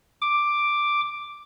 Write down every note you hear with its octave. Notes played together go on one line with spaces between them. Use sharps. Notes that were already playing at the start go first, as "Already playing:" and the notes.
D6